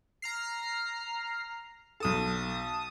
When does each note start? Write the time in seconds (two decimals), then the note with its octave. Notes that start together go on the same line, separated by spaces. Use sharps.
0.22 A#5 F6 C7
2.00 B1 A4 A5 D#6